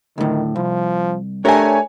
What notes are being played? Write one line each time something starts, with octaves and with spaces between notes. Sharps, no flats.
D2 A2 D#3
C2 F3
A3 D4 G4 A#4 C#5 G#5